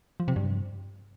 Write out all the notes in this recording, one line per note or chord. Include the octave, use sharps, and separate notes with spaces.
F3
C3
G2